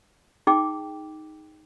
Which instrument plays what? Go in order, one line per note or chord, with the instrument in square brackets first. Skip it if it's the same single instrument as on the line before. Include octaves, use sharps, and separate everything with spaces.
[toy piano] D#4 G#4 G5 D6